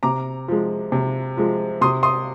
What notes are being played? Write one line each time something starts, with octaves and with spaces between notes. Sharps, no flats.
C3 A#5 D6
F3 G#3
C3
F3 G#3
C3 C6 D#6
C6 D#6